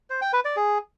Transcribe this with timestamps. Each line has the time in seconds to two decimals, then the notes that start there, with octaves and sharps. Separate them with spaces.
0.10 C5
0.21 G5
0.33 B4
0.45 D5
0.56 G#4